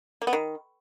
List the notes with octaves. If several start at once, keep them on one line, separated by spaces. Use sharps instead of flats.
A#3
B3
D#3